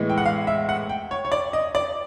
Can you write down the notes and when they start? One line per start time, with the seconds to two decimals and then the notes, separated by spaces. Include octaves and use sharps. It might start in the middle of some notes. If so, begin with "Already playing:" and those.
Already playing: A2 E3 G#3 B3
0.10 G5
0.18 F#5
0.26 F5
0.47 E5
0.69 F#5
0.89 G5
1.11 C#5
1.25 C#5
1.32 D5
1.53 D#5
1.75 D5